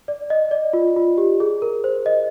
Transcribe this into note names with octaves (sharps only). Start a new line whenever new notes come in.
D5
D#5
D5
F4
F4
G4
G#4
A#4
C5
D#5